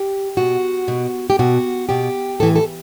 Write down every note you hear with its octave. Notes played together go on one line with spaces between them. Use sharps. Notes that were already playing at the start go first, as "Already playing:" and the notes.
Already playing: G4
B2 F#4
B2
G4
B2 F#4
B2 G4
A2 E3 A4
A4